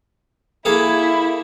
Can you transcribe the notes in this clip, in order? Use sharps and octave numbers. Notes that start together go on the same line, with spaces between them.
A#3 E4 G#4 A4